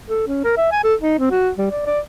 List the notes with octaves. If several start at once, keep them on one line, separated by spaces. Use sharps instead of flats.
A4
C#4
A#4
E5
G#5
A4
D#4
C4
F#4
G3
D5
D5